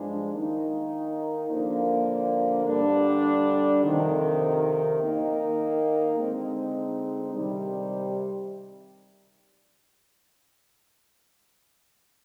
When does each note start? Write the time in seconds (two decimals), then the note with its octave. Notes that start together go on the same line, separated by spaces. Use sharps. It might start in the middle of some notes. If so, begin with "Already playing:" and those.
Already playing: G2 F3 G#3 D4
0.33 D#3 A#3 D#4
1.49 D3 F3 A#3 D4
2.66 G2 D3 G3 D4
3.83 F2 C3 D#3
5.00 D#3 A#3 D#4
6.17 D3 G#3 C4 D#4
7.33 C3 D#3 G3